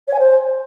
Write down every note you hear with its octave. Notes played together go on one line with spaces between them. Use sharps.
C#5
G#5
C5